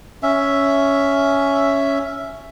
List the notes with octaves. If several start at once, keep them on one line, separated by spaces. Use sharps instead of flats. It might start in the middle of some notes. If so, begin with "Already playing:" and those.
C#4 E5